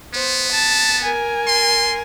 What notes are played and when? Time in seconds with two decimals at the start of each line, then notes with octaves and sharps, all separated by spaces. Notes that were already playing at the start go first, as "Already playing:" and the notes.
0.14 B3 C5
0.52 A5
1.04 A#4 G#5
1.48 C6